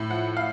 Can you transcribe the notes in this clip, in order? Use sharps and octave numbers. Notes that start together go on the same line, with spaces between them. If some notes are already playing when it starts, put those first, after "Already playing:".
Already playing: A2
F3 F#5
F5